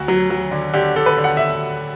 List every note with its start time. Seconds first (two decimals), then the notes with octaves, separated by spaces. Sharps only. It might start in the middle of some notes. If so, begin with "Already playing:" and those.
Already playing: D2 F#4
0.08 F#3
0.30 F#3
0.51 D3
0.73 D3 G4
0.96 D3 A4
1.06 B4
1.17 D3
1.24 F#5
1.37 E5